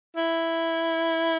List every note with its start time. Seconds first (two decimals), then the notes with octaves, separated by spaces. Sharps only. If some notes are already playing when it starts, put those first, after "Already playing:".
0.16 E4